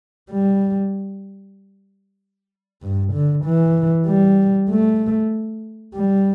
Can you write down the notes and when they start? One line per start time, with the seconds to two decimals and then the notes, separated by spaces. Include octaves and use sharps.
0.31 G3
2.82 G2
3.13 D3
3.45 E3
4.07 G3
4.70 A3
5.94 G3